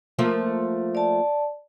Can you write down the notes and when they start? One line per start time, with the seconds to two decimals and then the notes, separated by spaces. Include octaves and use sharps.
0.19 F3 A3 A#3
0.95 D5 A5